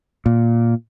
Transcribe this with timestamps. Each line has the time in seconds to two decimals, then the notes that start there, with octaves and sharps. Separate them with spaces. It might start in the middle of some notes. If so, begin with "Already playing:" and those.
0.26 A#2